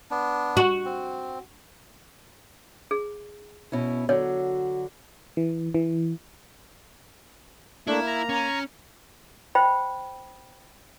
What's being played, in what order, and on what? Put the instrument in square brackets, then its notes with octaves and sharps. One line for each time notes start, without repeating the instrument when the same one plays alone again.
[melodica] B3 D4
[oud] F#4
[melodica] C4
[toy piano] G#4
[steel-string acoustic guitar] B2 C#4 E4
[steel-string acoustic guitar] D3 F#3 [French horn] F#4 [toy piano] C#5
[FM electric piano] E3
E3
[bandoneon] A3 D4 [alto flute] A#3 [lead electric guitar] E4
[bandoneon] A#5
[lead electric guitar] C#4
[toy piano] C5 G5 B5